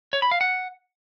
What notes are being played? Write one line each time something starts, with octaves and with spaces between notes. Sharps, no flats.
C#5
B5
F5
F#5